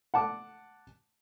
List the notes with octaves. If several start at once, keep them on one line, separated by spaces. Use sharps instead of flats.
F#5 A5 D6